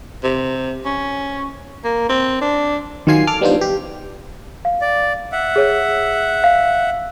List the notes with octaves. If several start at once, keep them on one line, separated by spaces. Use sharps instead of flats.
C3
C#4
A#3
C4
D4
D#3 F#3 F4 G#5 C7
A4 D6 F6
G3 B3 D4 D#4 F4 C5
G4
F5
D5
E5 F#5
G#4 C#5
F5